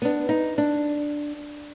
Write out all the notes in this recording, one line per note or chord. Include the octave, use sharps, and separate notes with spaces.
B3 D4
D#4
D4